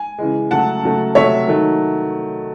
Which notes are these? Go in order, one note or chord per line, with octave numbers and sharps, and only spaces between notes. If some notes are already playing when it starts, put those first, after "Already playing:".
Already playing: G#5
C#3 E3 G#3
C#3 F#3 A3 F#5 A5
C#3 F#3 A3
C3 F#3 A3 C#5 E5
D#3 F#3 A3